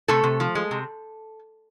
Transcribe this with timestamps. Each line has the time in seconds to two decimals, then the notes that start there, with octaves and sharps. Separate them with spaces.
0.08 C3 A3 A4
0.24 C3
0.40 F3
0.55 G#3
0.71 C3